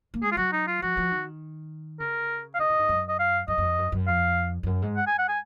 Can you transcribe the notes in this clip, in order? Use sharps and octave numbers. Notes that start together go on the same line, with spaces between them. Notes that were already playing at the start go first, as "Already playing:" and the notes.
A#3
G#3 G#4
F4
F#3 F#4
D#4
F4
F3 F#4
F3
D#3
C#3 A#4
F5
C3 D#5
A#2
G#2
F#2
D#5
F5
F#2 D#5
F#2
F2
F#2
F#2
F2 F5
F2
F#2
G#2
F#5
G#5
F#5
G#5